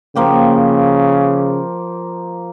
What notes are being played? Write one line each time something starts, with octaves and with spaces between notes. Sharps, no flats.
C#3 F3 A#3 G4